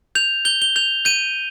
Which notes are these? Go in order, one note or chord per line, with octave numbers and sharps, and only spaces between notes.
G6 F7
G6 G7
G7
G6 F7
G6 D#7